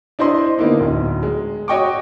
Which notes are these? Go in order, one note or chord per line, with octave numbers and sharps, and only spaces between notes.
D4 E4 C5 D#5 C6
D3 A#3 B3 D#4 E4
D1
G#3
F#4 C#5 D#5 G5 C#6 D6